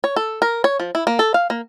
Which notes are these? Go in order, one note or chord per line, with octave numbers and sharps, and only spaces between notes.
C#5
A4
A#4
C#5
F3
E4
A#3
A4
F5
A#3